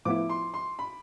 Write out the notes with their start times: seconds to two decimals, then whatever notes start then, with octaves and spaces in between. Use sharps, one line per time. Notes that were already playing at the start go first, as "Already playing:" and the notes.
0.05 A2 F3 B3 E4 D6
0.30 C6
0.54 C6
0.79 B5